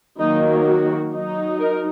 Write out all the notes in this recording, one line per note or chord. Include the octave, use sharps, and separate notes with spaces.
D#3 F#3 A#3 D#4
F#4
F#3 D#4
A#4